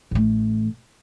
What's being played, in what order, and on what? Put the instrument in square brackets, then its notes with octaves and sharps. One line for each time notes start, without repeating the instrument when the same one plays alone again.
[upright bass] A1 A3